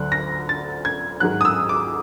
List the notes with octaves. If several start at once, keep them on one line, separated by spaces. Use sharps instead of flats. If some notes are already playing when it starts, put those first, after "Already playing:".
Already playing: D2 D3 F#3 F#6
A#6
A6
G#6
G#2 D#3 F#3 F#6
D#6
E6
D6